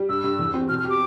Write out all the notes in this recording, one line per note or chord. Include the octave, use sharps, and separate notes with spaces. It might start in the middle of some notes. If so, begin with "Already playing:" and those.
Already playing: G3
G2 E6
G2
E2
C4
B2 F6
F6
G4
D6